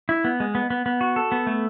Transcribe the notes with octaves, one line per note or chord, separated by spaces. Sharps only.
E4
B3
G#3
B3
B3
B3
F#4
A4
B3
A3